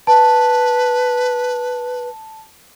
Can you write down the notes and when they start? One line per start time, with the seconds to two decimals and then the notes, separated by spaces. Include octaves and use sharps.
0.07 B4 A5